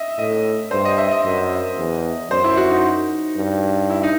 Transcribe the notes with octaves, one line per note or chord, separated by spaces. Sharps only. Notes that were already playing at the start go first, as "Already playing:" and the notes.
Already playing: D#5 E5
A2 D#5
G2 C5
D#5
E5
D#5
F#2
E2
F#2 C5
E4
F#4
D#4
G2
E4
D#4